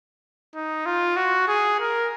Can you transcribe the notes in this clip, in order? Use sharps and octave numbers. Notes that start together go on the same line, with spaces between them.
D#4
F4
F#4
G#4
A#4